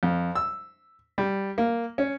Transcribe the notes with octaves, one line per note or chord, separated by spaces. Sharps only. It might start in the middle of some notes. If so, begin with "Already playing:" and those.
F2
E6
G3
A#3
C#4